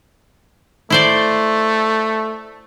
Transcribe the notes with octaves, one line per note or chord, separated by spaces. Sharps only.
A3 E4 C5 D5